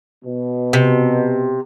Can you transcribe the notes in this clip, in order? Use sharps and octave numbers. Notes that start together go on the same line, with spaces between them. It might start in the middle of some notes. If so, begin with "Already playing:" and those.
B2
C3